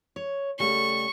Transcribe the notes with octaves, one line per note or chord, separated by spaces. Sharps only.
C#5
C#3 G3 A3 C#6